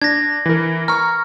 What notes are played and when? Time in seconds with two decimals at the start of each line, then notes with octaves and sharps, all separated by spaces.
0.02 D4 G#6 A#6
0.46 E3 A#4
0.88 A#5 C#6 F6